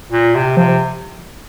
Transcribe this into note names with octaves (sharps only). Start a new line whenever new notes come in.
A#2
C3
C3 F3